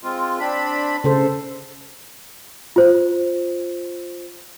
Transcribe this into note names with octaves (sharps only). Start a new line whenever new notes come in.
G#3 C4 F4
C4 D4 B5
C#3 A4 C5
F4 C5